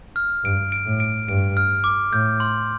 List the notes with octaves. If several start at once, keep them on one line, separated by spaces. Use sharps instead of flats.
F6
G2 D7
D7
A2
D7
G2 D7
F6
D6
A2 G6
C6